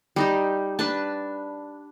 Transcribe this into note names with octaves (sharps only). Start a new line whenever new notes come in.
G3 D#4 G4
D4 B4 A5